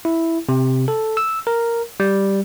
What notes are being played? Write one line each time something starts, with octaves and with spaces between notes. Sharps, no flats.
E4
C3
A4
E6
A#4
G3